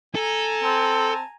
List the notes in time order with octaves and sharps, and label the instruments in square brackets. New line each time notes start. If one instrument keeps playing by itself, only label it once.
[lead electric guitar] A4 [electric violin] G#5 A#5
[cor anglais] C4 [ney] A5